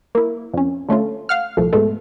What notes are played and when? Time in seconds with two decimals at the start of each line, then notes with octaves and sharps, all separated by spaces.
0.15 A#3 E4
0.54 F2 C#4
0.88 D3 A3 C#4 F4
1.29 F5 F#5 F6
1.57 C2 A#2 F3 A3
1.73 G#2 B2 G#3 A3